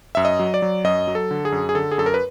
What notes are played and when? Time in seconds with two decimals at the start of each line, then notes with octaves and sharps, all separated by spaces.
0.15 F#2 E5
0.25 D#5
0.39 F#3
0.54 D5
0.62 F#3
0.84 F#2 D#5
1.08 F#3
1.15 A4
1.31 D3
1.45 G#4
1.52 F#2
1.69 G#4
1.75 D3 A4
1.91 G#4
1.98 F#2 A4
2.06 A#4
2.14 B4